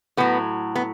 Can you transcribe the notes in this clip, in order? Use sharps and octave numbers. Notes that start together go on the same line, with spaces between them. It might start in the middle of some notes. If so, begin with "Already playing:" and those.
A2 F#3 B3
B3